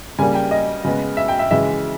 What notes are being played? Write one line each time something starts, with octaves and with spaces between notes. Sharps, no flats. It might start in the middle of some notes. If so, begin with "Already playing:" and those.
C#3 G3 A#3 G#5
G5
D#5
C#3 G#3 B3
E5
G5
E5
C#3 E3 G#3 E5